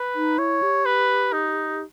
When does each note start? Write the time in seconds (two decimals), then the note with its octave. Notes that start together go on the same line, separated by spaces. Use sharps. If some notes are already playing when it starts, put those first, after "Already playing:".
Already playing: B4
0.15 D#4
0.38 E4 C#5
0.62 G4
0.85 B4
1.33 D#4